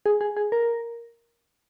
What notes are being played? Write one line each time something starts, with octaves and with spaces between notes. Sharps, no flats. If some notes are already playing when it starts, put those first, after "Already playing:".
G#4
G#4
G#4
A#4